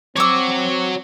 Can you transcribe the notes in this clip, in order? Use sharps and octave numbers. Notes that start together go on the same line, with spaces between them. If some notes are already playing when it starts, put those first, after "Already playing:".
C4 F#4 C#5 D6 E6